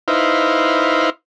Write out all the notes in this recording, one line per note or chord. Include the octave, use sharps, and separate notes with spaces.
D#4 E4 B4 C5 F5